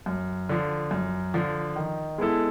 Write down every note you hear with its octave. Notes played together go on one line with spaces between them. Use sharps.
F#2
D3 F3
F#2
D3 F3
D#3
G#3 B3 E4 A4